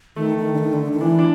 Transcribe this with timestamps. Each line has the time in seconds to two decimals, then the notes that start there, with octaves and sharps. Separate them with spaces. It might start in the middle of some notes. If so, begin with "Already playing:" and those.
0.16 D#3 A3
0.38 D#3
0.54 D3
0.58 D#3
0.73 D3
0.93 D#3
1.01 E3 D4
1.19 D4